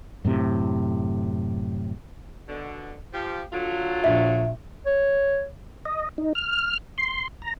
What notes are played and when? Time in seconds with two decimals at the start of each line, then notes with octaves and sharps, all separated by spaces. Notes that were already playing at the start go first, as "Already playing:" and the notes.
0.25 F#2 A2 C3
2.49 B2 D3
3.13 F3 G4
3.53 D3 F#3 F4
4.04 A#1 F3 E5
4.86 C#5
5.85 D#5
6.18 D#4
6.35 F6
6.98 C6
7.42 A#5